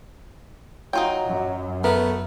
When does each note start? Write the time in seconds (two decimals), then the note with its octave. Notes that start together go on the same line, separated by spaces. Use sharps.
0.93 F#3 D#4 F4 G5
1.24 F#2
1.84 A3 B3 A#4